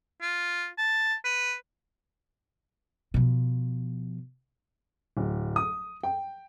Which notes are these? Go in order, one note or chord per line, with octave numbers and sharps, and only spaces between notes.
F4
A5
B4
B2 F3
D1
D#6
G5